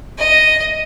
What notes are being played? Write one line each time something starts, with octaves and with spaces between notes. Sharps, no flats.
D#5